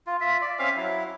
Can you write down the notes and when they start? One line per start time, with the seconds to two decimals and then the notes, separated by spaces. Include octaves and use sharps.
0.07 F4
0.21 F4 E5
0.42 D5
0.59 C4 C#4 E5 F5
0.76 F#3 E4